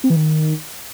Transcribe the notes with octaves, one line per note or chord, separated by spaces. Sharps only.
C4
E3
D#3